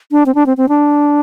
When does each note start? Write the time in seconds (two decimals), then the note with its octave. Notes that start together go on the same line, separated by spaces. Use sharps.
0.12 D4
0.26 C4
0.35 D4
0.46 C4
0.57 C4
0.69 D4